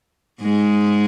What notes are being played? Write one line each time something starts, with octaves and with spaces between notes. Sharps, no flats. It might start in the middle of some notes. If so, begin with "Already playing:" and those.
G#2 G#3